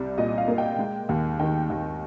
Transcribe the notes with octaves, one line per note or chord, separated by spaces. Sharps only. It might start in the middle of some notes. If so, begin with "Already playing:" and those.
Already playing: C2 G3 D5
A#2 D#5
F5
A#3
G5
G#3
D#2
D#3 G5
D#2